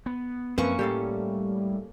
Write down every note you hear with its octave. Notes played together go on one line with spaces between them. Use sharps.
B3
F#2 F3 A#3 C4 C#4 B4 C#6
A2 G3 G4 A4 F5